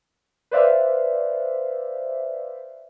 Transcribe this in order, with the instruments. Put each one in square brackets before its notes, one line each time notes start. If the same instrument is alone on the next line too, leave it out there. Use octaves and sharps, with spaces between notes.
[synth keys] B4 C5 D5 E5 F5